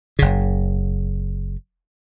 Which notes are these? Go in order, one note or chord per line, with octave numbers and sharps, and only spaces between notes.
F#1 C#3